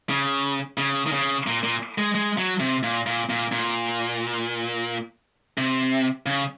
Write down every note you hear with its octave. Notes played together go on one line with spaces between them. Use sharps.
C#3
C#3
D#3
C#3
A#2
A#2
G#3
G#3
F#3
C3
A#2
A#2
A#2
A#2
C3
C#3